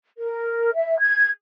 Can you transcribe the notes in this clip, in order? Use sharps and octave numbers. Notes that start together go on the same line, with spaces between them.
A#4
E5
G#6